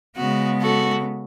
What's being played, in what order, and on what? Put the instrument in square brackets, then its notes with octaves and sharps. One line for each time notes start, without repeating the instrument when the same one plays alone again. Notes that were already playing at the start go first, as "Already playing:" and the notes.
[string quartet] C#3 G#3 B3 F#4
F#4 A4